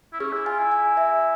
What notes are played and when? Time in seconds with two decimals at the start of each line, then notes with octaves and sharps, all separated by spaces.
0.14 E4
0.20 C#4 G#4
0.33 E4
0.46 F4 G#5
0.59 E4
0.72 G#5
0.97 E5